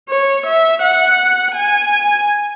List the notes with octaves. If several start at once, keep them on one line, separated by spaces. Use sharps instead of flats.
C#5
E5
F#5
G#5